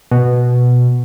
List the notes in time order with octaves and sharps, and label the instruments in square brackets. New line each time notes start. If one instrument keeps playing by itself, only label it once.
[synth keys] B2